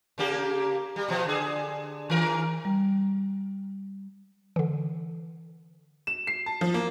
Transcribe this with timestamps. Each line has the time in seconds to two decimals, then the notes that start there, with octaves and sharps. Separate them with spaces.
0.18 C#3 A#3 G4
0.96 G3
1.09 B2 F3
1.26 D3 G#4
2.10 D#3 A#4
2.65 G3
4.56 D3 E3
6.07 E7
6.27 C7
6.46 A5
6.61 F3
6.74 A#3